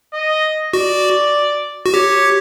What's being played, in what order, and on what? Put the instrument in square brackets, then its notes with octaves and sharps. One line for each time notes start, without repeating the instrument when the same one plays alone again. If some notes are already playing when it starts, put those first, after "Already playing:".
[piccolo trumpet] D#5
[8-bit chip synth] F#4 [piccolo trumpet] D5
[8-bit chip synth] F#4
[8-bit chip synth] G4 [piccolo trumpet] C#5